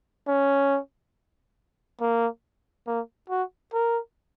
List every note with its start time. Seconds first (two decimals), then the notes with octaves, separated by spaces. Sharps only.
0.28 C#4
2.01 A#3
2.87 A#3
3.30 F#4
3.73 A#4